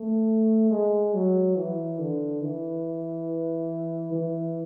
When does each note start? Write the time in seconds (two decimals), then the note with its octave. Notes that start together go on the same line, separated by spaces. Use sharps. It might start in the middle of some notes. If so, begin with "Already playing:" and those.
Already playing: A3
0.71 G#3
1.14 F#3
1.56 E3
1.99 D3
2.41 E3
4.12 E3